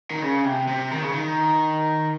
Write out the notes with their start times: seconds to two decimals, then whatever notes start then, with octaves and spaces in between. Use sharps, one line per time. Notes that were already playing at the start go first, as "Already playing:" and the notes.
0.11 D#3
0.22 C#3
0.45 C3
0.68 C3
0.91 D#3
1.02 C#3
1.13 D#3